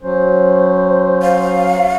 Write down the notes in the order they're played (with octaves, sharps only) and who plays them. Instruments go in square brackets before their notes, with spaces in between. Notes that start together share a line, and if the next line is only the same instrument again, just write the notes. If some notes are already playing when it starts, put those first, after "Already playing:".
[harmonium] F#3 C#4 [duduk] C5
[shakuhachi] F5